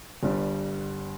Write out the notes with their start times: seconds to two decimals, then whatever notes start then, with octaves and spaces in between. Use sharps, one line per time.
0.23 G1 G2 G3